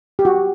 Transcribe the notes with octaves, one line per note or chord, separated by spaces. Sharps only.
G4
F#4